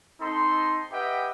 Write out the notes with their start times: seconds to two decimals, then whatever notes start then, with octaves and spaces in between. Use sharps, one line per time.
0.20 C4 D#4 A4 C6
0.91 G4 B4 D#5 E5 F#5 G5